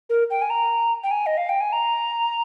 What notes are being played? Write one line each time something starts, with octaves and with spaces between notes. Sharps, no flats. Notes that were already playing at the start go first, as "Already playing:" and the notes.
A#4
G5
G#5
A#5
G5
G#5
D#5
F5
G5
G#5
A#5